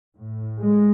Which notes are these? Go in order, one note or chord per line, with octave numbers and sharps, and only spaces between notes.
A2
G#3